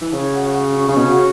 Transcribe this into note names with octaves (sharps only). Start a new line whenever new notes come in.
E3
C#3 C#5
F#4
F#4
C#4
C#3 C#4
B2
C#3 F#4